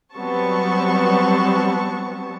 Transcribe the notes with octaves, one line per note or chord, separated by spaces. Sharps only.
F#3 G3 B3 C4 A5 C#6